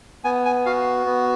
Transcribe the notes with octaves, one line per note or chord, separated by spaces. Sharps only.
B3 G#5
G#5
F#4 F5
B3